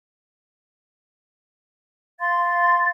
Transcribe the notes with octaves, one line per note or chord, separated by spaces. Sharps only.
F5 C6 A6